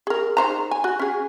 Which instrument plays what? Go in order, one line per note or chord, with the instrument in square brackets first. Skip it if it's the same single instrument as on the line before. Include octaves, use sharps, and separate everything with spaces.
[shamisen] G#4 A#4
D#3 C5 A#5
G#5
F#4
C#4 G#4